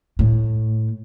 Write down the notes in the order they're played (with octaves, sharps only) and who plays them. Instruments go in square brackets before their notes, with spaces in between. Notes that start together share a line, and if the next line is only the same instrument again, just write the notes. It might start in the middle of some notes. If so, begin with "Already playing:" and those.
[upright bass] A2